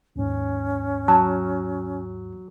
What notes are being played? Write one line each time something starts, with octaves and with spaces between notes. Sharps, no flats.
D#2 G#2 C#4
F#3 A5